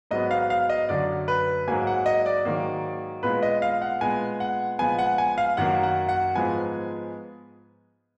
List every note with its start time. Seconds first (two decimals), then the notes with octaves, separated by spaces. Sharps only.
0.11 G#2 F#3 B3 D#5
0.31 F5
0.50 F5
0.70 D#5
0.89 F#2 D3 F#3 D5
1.28 B4
1.68 G#2 F#3 A#3 G#5
1.87 F#5
2.06 D#5
2.26 D5
2.45 G#2 D#3 F#3 A#3
3.23 A#2 G#3 B3 B4
3.43 D#5
3.62 F5
3.82 F#5
4.01 A#2 G#3 B3 G#5
4.40 F#5
4.79 A#2 F3 G#3 B3 G#5
4.99 F#5
5.18 G#5
5.38 F5
5.57 F#2 D#3 F#3 A#3 F#5
5.83 F#5
6.09 F#5
6.35 G#2 F3 G#3 B3 G#5